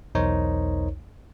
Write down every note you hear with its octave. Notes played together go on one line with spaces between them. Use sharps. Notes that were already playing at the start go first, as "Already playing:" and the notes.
B1 E2 D#4 A#4 C5 C#5